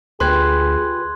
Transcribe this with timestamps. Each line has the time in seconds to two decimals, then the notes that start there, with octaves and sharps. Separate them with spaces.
0.20 D2 F4 G4 G#4 B4 C6 F#6 G#6